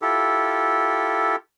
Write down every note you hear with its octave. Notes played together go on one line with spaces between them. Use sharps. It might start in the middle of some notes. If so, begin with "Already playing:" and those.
E4 F4 G4 A4